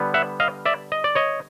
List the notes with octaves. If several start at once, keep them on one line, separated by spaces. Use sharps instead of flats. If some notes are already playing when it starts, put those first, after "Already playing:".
Already playing: D3 G3 B3
E5 F#5
D#5 F5
D5 E5
D#5
D5
C#5 D#5